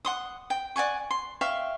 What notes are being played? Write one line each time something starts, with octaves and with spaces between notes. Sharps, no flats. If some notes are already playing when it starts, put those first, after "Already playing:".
F#5 C6 D#6
G5
D5 F#5 G#5 C#6
C6
E5 F5 G5 C#6